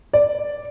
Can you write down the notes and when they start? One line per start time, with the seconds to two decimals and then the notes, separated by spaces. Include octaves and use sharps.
0.13 D5